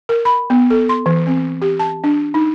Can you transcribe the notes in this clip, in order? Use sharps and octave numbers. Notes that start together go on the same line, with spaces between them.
A#4
B5
B3
A4
C6
E3
C4
G4
A5
D4
D#4